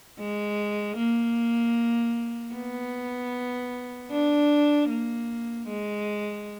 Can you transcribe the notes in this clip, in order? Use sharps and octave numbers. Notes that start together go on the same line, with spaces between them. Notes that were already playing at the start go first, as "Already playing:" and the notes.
G#3
A#3
B3
D4
A#3
G#3